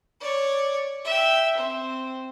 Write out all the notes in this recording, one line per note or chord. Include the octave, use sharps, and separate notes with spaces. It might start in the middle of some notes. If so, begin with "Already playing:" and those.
C#5 D5
E5 G5
C4